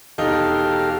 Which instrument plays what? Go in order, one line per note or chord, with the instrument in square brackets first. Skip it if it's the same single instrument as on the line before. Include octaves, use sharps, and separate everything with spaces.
[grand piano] E1 D#4 [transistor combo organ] G4 A4 F5